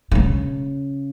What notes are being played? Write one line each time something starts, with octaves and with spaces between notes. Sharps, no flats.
D3
C#3